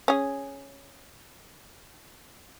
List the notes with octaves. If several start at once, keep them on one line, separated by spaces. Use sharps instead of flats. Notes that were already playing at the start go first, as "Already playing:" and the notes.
C#4 G#4